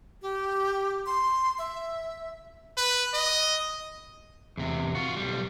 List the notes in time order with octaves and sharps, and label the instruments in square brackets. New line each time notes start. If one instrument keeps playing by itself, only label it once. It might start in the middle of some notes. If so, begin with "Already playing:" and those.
[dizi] G4
C6
E5
[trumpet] B4
D#5
[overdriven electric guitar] E2 C3
F4 F#4
B1 G3